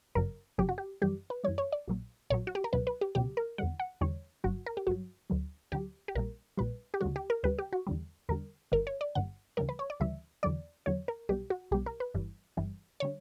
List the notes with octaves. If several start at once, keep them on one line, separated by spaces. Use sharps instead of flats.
G1 F#2 C#3 F#3 A#4
G1 F#2 C#3 F#3 G4
F#4
G4
F#2 E3 G3 G4
B4
F#2 E3 G3 C#5
C#5
D5
A#1 A#2 F#3
A#1 A#2 F#3 C#5
F#4
G4
A#4
C#2 B2 F#3 B4
B4
G4
C#2 B2 F#3 G4
A#4
E2 D3 G3 F#5
F#5
E2 D3 G3 C#5
G1 G2 F#3 F#4
A#4
G4
G1 G2 F#3 F#4
D2 D3 F#3
D2 D3 F#3 G4
G4
A#1 A#2 G3 A#4
A#1 A#2 G3 B4
G4
D2 C#3 G3 F#4
G4
A#4
D2 C#3 G3 B4
G4
F#4
E2 D3 G3
E2 D3 G3 A#4
G1 G2 D3 A#4
C#5
D5
G1 G2 D3 F#5
D2 C#3 E3 G3 A#4
B4
C#5
D5
D2 C#3 E3 G3 E5
E2 D3 F#3 D5
E2 D3 F#3 C#5
A#4
B1 B2 G3 G4
F#4
B1 B2 G3 G4
A#4
B4
G1 G2 E3 G3
G1 G2 E3 G3
D3 G3 C#5